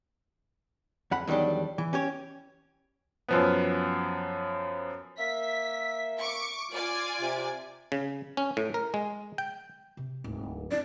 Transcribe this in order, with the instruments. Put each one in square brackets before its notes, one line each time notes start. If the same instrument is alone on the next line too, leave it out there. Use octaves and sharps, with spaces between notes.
[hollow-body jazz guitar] F2 F#5 B5
E2 D#3 F#3 G3 D4
E3
C#4 G4 C#5
[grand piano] F#2 F3 B3
[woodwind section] A#3 E5 [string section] B6
[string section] C#6 D6
F4 D5 G#5
[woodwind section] C3
[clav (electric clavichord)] C#3
C#4
A2
A#4
G#3
G5
[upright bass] C3
D1 G#2
[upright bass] D4 E4 [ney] D5